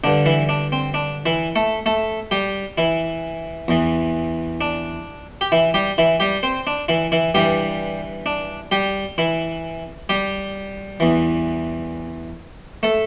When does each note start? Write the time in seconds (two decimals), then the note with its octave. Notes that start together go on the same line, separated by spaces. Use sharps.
0.04 G2 D3 D4
0.26 E3 E4
0.49 D4
0.72 C4
0.94 D4
1.26 E3 E4
1.56 A3 A4
1.86 A3 A4
2.31 G3 G4
2.78 E3 E4
3.68 E2 E3
4.61 D4
5.41 G4
5.52 E3 E4
5.74 G3 G4
5.98 E3 E4
6.20 G3 G4
6.43 C4 C5
6.67 D4
6.88 E3 E4
7.12 E3 E4
7.35 G2 E3 G3 G4
8.26 D4
8.71 G3 G4
9.18 E3 E4
10.09 G3 G4
11.00 E2 E3
12.83 A3 A4